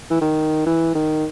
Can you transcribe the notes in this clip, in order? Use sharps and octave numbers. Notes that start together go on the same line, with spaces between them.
E3
D#3
E3
D#3